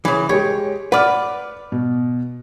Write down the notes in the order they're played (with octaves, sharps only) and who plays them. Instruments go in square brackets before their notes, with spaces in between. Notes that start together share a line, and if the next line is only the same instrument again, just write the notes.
[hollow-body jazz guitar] C#3 E3
[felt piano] G#3 G4 [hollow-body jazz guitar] C#5
[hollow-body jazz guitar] B4 D5 [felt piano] F#5 D6 F6
[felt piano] B2